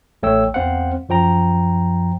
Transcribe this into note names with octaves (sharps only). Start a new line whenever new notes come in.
A1 A3 C#5 G5 E6
E2 C4 C5 F5 F#5
F#2 F3 G5 A#5